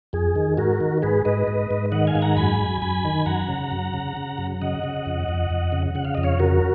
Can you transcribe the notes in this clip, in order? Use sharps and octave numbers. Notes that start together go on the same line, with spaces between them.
F2 G#4
D#3
G#2 F#4 A#4
D#3
G#2 G#4 B4
G#2 B4 D#5
G#2
G#2
D#3 D#5 F#5
F5 G#5
G#2
F#5 A#5
F#2 G#5 B5
F#2
F#2 G#5 B5
D#3
F#2 F#5 A#5
C#3
F#2
C#3
C#3
F#2
C#3 D#5 F#5
C#3
F2
F2
F2
C#3
C#3 F#5
F5
F2 D#5
C#5 F5
C#3 F#4 A#4